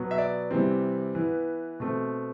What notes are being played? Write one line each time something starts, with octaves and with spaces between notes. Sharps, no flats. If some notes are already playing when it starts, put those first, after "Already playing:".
Already playing: B2 F#3 B3
E5
D5
C3 E3 G3 C4
E3 B3
B2 A3 C4